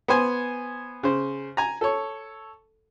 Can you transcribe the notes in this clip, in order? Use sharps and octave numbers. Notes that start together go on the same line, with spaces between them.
B3 C5 G#5
C#3 C5
G#5 A#5
A4 C#5